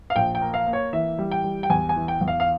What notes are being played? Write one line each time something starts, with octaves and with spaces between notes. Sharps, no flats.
F5
A#1 G5
G5
A#3
F5
A#3
C#5
E3 E5
G3
G5
G3
G5
E2 G#5
G#5
E3
G5
E2
F5
F5